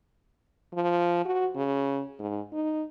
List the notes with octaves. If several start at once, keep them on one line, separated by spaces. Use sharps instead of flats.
F3
F#4
C#3
G#2
D#4